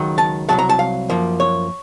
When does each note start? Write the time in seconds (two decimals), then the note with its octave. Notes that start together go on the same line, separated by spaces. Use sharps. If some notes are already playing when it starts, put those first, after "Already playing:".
Already playing: C#2 D#3 F#3
0.18 A5
0.49 C2 C3 F#3 A5
0.58 A#5
0.69 A5
0.79 F5
1.10 F#2 F3 A#3
1.40 C#5